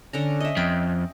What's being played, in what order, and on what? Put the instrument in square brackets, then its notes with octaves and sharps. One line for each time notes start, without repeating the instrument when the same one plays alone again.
[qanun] D3 C#4 A#5
D#5 E5
[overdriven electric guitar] F2 [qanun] G5